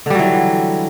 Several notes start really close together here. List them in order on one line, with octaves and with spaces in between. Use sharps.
D3 G3 F#3 E3